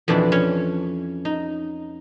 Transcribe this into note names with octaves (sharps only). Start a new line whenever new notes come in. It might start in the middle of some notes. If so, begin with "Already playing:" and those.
F2 B2 E3 D4 B4
C#4 C#5
D#4